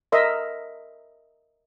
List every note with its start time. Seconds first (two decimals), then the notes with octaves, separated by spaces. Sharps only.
0.12 A#4 D#5 E5 C6